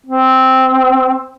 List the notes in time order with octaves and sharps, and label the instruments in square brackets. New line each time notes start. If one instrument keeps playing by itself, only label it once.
[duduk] C4